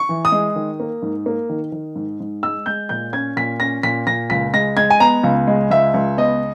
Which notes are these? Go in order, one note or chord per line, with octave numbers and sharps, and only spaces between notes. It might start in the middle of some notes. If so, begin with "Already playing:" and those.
Already playing: C#6
E3
D#6
G#3
D#3
A#3
G#2
A#3
D#3
D#3
G#2
G#2
G#3 E6
G#3 G6
A#2 G6
C#4 G#6
A#2 B6
C#4 A#6
A#2 B6
A#2 A#6
C#2 B6
G#3 A#6
G#3 G#6
G#5
B3 A#5
C#2
G#3
C#2 E5
C#2
B3 D#5